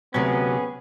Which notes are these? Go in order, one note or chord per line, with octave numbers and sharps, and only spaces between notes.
D2 C3 F#3 B3 C#4 G#4